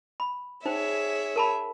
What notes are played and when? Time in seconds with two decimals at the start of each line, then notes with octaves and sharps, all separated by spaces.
0.20 B5
0.65 D#4 G#4 C5 C#5 E5 G5
1.36 A#4 A5 B5